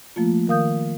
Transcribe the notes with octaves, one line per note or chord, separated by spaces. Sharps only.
F3 A3 A#3 F4
D#3 A#4 F5 D#6 G6